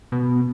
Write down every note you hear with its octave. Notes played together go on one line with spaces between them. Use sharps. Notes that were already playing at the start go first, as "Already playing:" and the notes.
B2